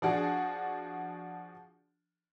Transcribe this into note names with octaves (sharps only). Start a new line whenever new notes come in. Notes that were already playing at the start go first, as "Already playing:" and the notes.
F3 D4 F#4 G#4